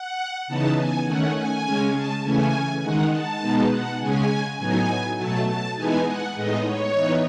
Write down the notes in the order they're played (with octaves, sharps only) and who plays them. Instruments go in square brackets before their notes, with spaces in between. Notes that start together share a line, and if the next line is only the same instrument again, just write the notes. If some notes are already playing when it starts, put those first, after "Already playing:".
Already playing: [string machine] F#5
C#3 E3 B3 D#4 A5
G#5
D#3 A3 C#4 F#5
G#5
C#3 G#3 C#4
A5
C#3 E3 A3 C#4 G#5
D#3 G#3 D#4 F#5
A5
B2 G#3 B3 D#4
F#5
C#3 G#3 C#4 G#5
A2 F#3 B3 D#4 G#5
B2 F#3 A3 A5
A5
E3 G#3 B3 D#4 G#5
F#5
A2 G#3 B3 D#4 D#5
C#5
E3 B3 D#4